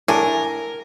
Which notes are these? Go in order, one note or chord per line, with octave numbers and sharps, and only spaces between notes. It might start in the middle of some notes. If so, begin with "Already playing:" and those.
A2 D4 A#4 G#5